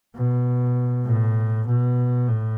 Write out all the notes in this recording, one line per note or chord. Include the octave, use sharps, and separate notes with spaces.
B2
A2
B2
A2